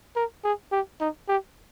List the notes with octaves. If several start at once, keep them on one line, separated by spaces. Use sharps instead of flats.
A#4
G#4
G4
D#4
G4